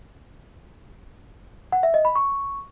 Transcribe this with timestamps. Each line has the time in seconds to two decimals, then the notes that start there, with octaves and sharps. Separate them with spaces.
1.72 F#5
1.83 E5
1.94 D#5
2.05 B5
2.15 C#6